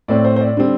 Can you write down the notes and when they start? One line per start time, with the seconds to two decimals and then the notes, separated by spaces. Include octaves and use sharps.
0.08 A2 A3 C4 D5
0.25 C5
0.36 C5
0.41 D5
0.57 D3 G3 C4